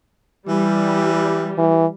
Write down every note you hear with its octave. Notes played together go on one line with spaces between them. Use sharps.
E3 G3
E3